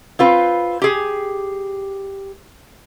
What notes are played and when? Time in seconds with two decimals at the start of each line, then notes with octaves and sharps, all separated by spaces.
0.19 C4 F4 B4
0.82 G4 G#4